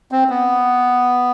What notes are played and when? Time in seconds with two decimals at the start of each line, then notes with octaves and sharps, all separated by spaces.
0.12 C4
0.30 B3